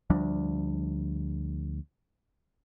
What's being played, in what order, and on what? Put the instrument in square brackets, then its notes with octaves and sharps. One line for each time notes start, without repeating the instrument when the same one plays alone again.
[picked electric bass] D2 F3 G3 D4